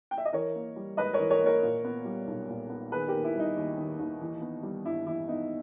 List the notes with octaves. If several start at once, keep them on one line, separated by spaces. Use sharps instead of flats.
G5
E5
D#5
E3 A#4 C#5
A#3
G3
G#2 B4 D#5
A#4 C#5
E3
A#4 C#5
A#3 A#4 C#5
A#2
B3
G3
B1
A#2
B3
D#3 G#4 B4
D#2 G4 A#4
E4
G3 D#4
D#2
D#3
D#2
E3
B3
G3
G2 E4
E3 E4
B3 D#4